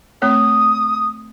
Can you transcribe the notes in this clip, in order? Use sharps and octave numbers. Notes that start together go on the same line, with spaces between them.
A3 C4 C#5 D#6